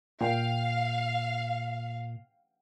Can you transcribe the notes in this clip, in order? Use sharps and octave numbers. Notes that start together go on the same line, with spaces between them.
A#2 F5 G5